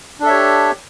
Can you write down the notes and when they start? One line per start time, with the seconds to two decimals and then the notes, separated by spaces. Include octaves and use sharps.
0.20 D4
0.23 A4
0.26 E5
0.29 C#5
0.32 G4